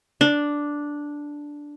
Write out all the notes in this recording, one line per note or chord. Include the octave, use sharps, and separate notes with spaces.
D4